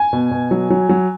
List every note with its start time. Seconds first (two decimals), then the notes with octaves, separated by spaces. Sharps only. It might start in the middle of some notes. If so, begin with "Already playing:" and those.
Already playing: G#5
0.13 B2
0.31 B2
0.51 F#3
0.70 F#3
0.89 F#3